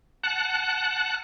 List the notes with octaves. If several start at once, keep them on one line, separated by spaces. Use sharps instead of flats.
F#5 A5 F#6